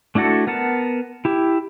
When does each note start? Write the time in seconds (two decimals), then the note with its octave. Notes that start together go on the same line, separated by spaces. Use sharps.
0.15 A3 D4 E4 F#4 A4
0.47 B3 A#4 F#5 A5
1.25 E4 G4